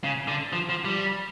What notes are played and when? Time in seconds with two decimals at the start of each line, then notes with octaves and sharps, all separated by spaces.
0.04 C#3
0.28 D3
0.53 F3
0.69 F3
0.85 G3